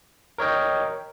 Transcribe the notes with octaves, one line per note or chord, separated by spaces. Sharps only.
A#4 C#5 D#5 G5